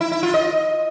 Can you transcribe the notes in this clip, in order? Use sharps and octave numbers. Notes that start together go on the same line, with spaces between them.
E4
E4
F4
D#5